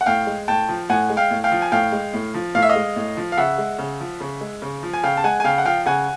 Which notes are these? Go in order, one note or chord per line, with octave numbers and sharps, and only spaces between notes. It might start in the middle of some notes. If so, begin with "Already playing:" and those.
F#5
A2 F5 G5
G#3
A2 G5 A5
F3
A2 F#5 G#5
G#3
F5 G5
A2
F5 G5
F3
G#5
A2 F5 G5
G#3
A2
F3
A2 F5
E5
D#5 F5
G#3
A2
F3
F5
C#3 E5 F#5
G#3
C#3
F3
C#3
G#3
C#3
F3
G#5
C#3 F5 G5
A5
G#3 F#5 G#5
G#5
C#3 F5 G5
F#5
F3 F5 G5
C#3 F#5 G#5